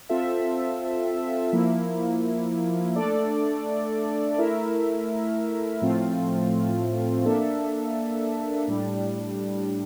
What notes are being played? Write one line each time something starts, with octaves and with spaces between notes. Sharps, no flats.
C4 F4 A4 E5
F3 A#3 E4
A3 D4 A4 D5
A3 E4 A#4 E5
A2 F3 A3 C4 F4
A#3 D4 A4 E5
A2 G3 D4